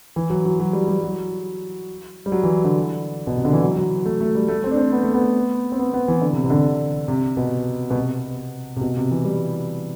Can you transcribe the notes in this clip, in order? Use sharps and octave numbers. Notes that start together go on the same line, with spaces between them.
E3
F#3
F#3
F#3
G3
G3
F#3
G3
F#3
E3
D3
B2
C3
D3
E3
F#3
F#3
A3
A3
G3
A3
C4
D4
C4
B3
A3
B3
C4
B3
B3
E3
D3
C3
C3
D3
C3
C3
B2
B2
C3
C3
B2
C3
E3
G3